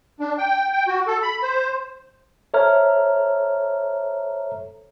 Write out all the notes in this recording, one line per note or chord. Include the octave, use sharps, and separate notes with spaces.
D4
G5
G5
F#4
A4
B5
C5
A4 C5 C#5 E5 A#5 F6